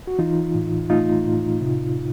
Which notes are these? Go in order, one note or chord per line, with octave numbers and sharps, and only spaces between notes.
F#4
E3 D#4 F4
A2
A3 D#4 F4
A2
C3